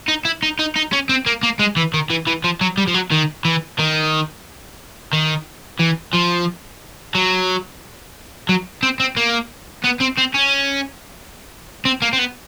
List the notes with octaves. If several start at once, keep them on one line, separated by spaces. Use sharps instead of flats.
D#4
E4
D#4
D#4
D#4
C#4
C4
A#3
A#3
G#3
E3
D#3
E3
E3
F3
F#3
G3
F3
F#3
D#3
E3
D#3
D#3
E3
F3
F#3
F#3
C4
C4
A#3
B3
C4
C4
C#4
C4
A#3
C4
B3